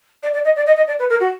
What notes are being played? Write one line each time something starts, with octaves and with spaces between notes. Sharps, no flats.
D5
D5
D#5
D5
D#5
D#5
D5
B4
A#4
F#4